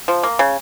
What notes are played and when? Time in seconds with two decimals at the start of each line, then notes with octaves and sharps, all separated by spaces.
0.08 F3
0.23 A#3
0.39 C#3